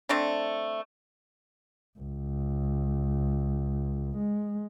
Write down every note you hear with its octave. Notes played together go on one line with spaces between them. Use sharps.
A3 C4 D4
C#2
G#3